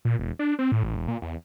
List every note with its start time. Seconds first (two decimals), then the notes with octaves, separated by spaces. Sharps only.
0.05 A#2
0.19 E1
0.39 D4
0.59 C4
0.72 A2
0.83 A1
0.95 E1
1.08 A#2
1.22 E2